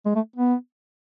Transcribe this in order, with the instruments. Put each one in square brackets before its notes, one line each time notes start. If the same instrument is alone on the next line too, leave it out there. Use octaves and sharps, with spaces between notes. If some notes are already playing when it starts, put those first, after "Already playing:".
[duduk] G#3
A3
B3